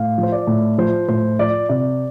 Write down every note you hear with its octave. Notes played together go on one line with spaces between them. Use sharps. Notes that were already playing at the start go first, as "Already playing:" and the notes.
Already playing: A2 F5
F3
C5
D5
A2
F3 C5
A2 C5
F3 D5
C3 D5